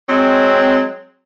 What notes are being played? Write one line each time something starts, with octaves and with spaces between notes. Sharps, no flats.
F#3 G#3 C4